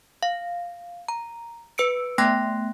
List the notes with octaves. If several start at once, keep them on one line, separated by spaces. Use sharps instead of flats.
F5
A#5
B4 E6 C#7 D7
A3 B3 G5 C6 F#6 A#6